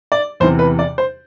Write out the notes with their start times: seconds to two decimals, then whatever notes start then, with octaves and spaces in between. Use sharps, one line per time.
0.12 D5
0.40 E2 C3 E3 C5
0.59 B4
0.79 D5
0.98 C5